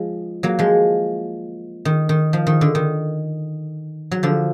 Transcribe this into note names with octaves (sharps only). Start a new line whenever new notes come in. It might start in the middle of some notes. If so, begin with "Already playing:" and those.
Already playing: F3 G#3
F#3 A#3
F3 G#3
D#3
D#3
F3
D#3
D3
D#3
F#3
D3 F3